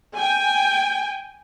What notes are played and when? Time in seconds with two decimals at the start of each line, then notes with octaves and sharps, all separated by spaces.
0.14 G5 G#5